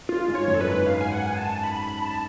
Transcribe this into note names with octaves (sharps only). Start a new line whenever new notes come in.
F4
G#2 G#3
C#5
F#2 F#3
A4
B4
G#2 G#3
F5
G#5
F#5
G#5
A5
B5
B5
A5